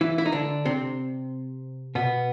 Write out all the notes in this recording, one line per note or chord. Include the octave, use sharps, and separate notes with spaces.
E3 E4
E4
D#4
D3 D4
C3 C4
B2 B3